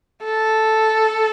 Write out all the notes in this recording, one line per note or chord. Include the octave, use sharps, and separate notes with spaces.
A4